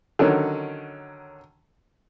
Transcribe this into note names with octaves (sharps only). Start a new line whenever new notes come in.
D3 D#3 F#3 C#4